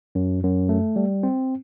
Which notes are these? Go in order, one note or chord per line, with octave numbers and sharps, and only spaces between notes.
F#2
F#2
A3
G3
C4